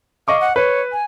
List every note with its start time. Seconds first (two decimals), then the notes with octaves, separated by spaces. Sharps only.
0.28 D#5 F5 C#6 D6
0.40 F#5
0.56 B4 C#5
0.92 G#5